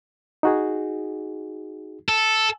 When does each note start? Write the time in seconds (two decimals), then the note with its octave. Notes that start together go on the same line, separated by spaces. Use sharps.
0.43 D#4 F#4 G#4
2.09 A4